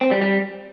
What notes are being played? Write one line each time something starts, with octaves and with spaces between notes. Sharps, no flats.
C4
G3
G3